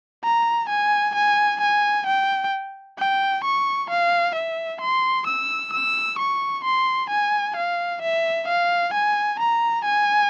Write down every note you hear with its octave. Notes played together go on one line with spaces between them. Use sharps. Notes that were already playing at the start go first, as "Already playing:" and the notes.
A#5
G#5
G#5
G#5
G5
G5
C#6
F5
E5
C6
E6
E6
C#6
C6
G#5
F5
E5
F5
G#5
A#5
G#5